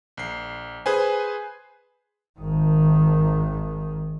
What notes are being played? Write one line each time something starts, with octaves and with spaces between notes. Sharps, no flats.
A#1 C7
G#4 B4 C5 G#5
G#1 D#3